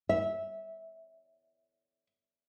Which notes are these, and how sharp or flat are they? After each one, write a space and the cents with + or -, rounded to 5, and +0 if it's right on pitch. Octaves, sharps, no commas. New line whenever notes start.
E5 -15